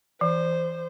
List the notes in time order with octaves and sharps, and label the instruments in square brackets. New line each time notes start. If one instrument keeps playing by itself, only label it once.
[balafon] E3 [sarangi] C5